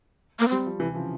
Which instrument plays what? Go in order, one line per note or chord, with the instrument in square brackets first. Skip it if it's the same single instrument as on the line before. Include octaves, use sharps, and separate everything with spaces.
[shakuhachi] A#3
[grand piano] G3 [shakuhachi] C4
[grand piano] F3
C3 E3
C#3 F3